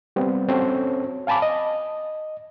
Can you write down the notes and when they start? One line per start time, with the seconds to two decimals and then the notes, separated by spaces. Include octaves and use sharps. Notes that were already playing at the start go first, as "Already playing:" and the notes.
0.16 G3 B3 C4
0.48 C4 C#4 F#4 A4 C#5
1.27 F5 G#5 A5 B5 D6
1.42 D#5